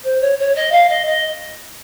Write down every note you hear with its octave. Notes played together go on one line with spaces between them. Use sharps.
C5
C#5
C#5
D#5
F5
D#5
D#5